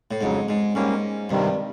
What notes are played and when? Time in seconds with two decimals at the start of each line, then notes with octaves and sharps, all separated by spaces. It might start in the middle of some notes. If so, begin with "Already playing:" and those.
0.11 A2
0.21 F2 G#2 C#3 F#3
0.49 G#2
0.75 G#2 G3 A#3 C#4
1.29 G2 C3 D#3 G3